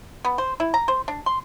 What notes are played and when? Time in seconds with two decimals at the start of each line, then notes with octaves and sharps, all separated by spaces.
0.25 B3
0.38 C5
0.60 E4
0.74 A#5
0.88 C5
1.08 D4
1.26 C6